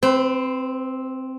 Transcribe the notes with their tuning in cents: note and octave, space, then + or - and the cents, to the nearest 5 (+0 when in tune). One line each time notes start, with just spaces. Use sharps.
C4 +0 B4 +45